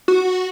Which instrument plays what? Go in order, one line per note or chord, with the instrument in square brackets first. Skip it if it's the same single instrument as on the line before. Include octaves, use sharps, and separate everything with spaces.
[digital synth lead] F#4